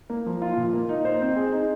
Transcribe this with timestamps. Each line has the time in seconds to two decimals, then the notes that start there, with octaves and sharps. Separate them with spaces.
0.10 A#3
0.26 F3
0.42 F4
0.57 A#2
0.73 A#3
0.89 D#4
1.05 C5
1.21 C4
1.36 G#4
1.52 D#4